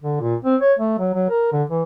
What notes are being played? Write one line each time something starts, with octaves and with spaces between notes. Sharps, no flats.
D3
A#2
C4
C#5
A3
F#3
F#3
A#4
D3
E3